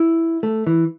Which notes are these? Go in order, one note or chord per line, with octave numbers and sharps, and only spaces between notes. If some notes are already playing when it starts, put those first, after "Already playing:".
Already playing: E4
A3
E3